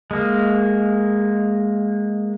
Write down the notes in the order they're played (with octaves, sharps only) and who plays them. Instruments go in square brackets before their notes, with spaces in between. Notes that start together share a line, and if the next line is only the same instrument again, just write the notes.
[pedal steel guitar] G#3 A#3